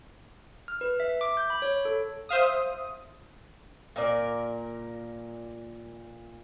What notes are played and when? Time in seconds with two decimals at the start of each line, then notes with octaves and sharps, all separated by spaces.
0.68 F6
0.81 B4
1.00 E5
1.21 D6
1.37 G6
1.50 B5
1.62 C#5
1.85 A4
2.29 C5 E5 F5 D#6
3.96 A#2 A#4 D5